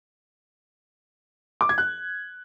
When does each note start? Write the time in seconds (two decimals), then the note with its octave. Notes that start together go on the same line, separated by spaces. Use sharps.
1.61 D6
1.69 G#6
1.78 F#6